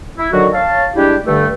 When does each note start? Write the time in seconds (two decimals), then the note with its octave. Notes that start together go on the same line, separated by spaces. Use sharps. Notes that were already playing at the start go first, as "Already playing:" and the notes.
0.18 E4
0.32 D3 D#3 F#3 F#4
0.54 C#5 F5 A5
0.96 G3 G#3 D4 E4 G4
1.26 G2 D3 A3